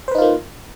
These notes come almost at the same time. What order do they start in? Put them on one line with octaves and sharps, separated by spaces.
C5 B4 D#4 F4 A#3